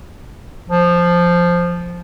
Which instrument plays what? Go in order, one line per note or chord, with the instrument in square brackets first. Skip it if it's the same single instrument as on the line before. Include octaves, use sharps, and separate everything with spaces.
[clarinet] F3